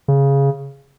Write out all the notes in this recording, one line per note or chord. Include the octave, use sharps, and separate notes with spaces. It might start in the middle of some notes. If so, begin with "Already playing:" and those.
C#3